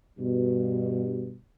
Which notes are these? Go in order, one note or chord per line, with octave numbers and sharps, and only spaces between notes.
G2 B2